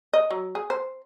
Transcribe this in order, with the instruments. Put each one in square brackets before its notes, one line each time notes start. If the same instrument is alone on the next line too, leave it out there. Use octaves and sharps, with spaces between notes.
[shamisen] D#5
F#3
G#4
C5